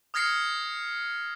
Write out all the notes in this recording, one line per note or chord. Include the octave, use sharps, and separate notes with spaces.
D#6 F6 G#6 A#6 C7 C#7